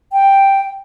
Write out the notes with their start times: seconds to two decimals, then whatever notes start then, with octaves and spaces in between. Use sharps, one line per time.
0.12 G5